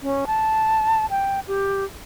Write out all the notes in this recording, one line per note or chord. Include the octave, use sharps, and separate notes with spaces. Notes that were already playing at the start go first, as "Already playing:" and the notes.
C#4
A5
G5
G4